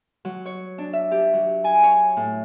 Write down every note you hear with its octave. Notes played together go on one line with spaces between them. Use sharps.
F#3
C#5
D4
E5
G4
F#3
G#5
C#5
A2